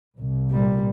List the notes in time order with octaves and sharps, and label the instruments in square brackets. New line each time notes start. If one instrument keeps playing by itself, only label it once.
[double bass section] C2
[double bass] A#2 G3